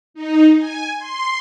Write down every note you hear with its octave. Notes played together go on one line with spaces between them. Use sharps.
D#4
G#5
C6